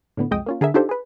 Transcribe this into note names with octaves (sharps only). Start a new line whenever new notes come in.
A2 D3 B3
B1 F2 G#3 D#5 G5 D#6
A#3 C#4 F4
D3 G#4 A#4 E5
D4 D#4 F4 G4 A4 C5
G#4 B4